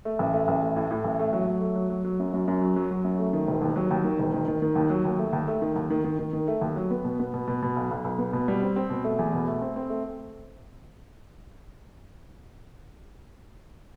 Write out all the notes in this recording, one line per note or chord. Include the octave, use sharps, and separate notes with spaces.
A3
A1
A3
A1
A3
A2
A2
A1
A3
F#3
F#3
A3
F#3
F#3
F#3
F#2
F#2
F#2
F#3
F#3
F#3
F#2
A3
D#3
E1
D#2
F#3
D#2
D#3
E1
D#3
D#3
D#3
D#2
F#3
D#2
A3
D#2
A3
D#3
D#2
D#3
D#3
D#3
D#3
A3
D#2
F#3
B3
B2
B3
B2
B2
B2
B1
B1
B1
B3
B2
G3
C4
C4
B2
A3
E2
B2
A3
C4
C4
A3